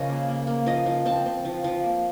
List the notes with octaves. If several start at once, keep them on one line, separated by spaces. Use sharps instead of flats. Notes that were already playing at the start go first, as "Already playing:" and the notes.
Already playing: C#3 F3 A#4 C#5 D#5
A#3
A#3
A#3
F3 D#5
F3
C4 A5
C4
F3
F3
A#3